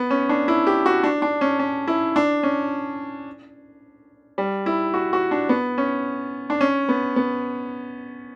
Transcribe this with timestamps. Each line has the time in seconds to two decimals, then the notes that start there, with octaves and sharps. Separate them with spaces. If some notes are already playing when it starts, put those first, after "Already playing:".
Already playing: B3
0.10 C#4
0.29 D4
0.48 E4
0.67 G4
0.86 F#4
1.03 D4
1.22 D4
1.41 C#4
1.59 C#4
1.88 E4
2.16 D4
2.43 C#4
4.38 G3
4.66 E4
4.94 F#4
5.13 F#4
5.31 D4
5.49 B3
5.78 C#4
6.50 D4
6.61 C#4
6.89 B3
7.16 B3